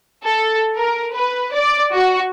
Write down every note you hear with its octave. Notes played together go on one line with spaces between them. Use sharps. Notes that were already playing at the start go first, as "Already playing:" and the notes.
A4
A#4
B4
D5
F#4